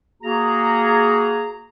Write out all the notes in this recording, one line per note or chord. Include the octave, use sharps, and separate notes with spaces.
A#3 F#4 G#4 A#5